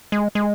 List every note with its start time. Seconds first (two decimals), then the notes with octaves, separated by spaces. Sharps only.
0.12 G#3
0.35 G#3